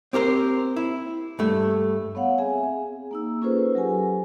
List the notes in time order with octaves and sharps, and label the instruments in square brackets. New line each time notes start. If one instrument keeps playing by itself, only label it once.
[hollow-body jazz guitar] C4 G4 A#4 C5
E4
G2 A3
[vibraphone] B3 C#5 F5 F#5
C4 G#4 E5 G#5
G#4
A#3 D#4 E6
C#4 F4 G#4 A4 B4 C5
F#3 G4 A4 G#5